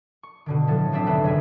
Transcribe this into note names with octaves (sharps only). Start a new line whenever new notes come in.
C#6
B2 D3 D#3
A2 F3 F#3 A4
G#1 C4 D4 E5 D#6
F1 B1 D#3 B4 E6
F#1 G#3 G#4 E5